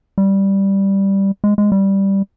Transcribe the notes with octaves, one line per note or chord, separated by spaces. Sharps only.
G3
G#3
G#3
G3